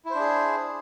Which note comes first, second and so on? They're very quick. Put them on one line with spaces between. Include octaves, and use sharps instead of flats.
E4 C5 D4 G#4